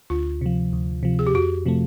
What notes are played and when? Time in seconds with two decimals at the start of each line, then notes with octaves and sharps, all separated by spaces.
0.10 D2 F4
0.41 C3 F3
0.73 D2
1.03 C3 F3
1.19 G#4
1.27 G4
1.34 F2 F#4
1.66 C3 F3 A3